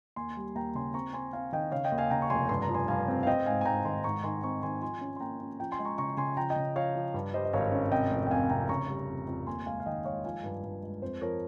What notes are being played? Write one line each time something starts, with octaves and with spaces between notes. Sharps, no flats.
D#2 G#5 C6
G3
D#2 G5 A#5
C#3 G#5 C6
C4 A#5 C#6
C4 G#5 C6
C4 F5 G#5
D#3 D#5 G5
C#3 C#5 F5
D#5 G5
D#2
F5 G#5
C#3 G5 A#5
C#6
F1 G#5 C6
G2 C6
A#5
F3
G#5 C6
G2 F5 G#5
C4
F5
C4 D#5 G5
G#2 F5 G#5
G#5
G#2 G5 A#5
D#3 G#5 C6
G#2 A#5 C#6
D#3 G#5 C6
C4 A#5 C#6
D#3 G#5 C6
F3 G#5 C6
C#4
C6
A#3 G5 A#5
C#4
F3 G5 A#5
G#5 C6
G#3
A#5 C#6
C#3 A#5 C#6
C#3 G#5 C6
F3 G5 A#5
D#5 G5
C#3
F3 C#5 F5
F3
G2
G3 C5 D#5
D#5
G#1 C#5 F5
C#4
C3 D#5 G5
F1
G5
F2 F5 G#5
C3 G5 A#5
C#3 A#5 C#6
G3
F2
F2
D#2 G#5 C6
G#3 F5 G#5
F5
D#3 D#5 G5
G#3 C#5 F5
F3 F5 G#5
G2
G2
G#3
F2 C5
F3 A#4 C#5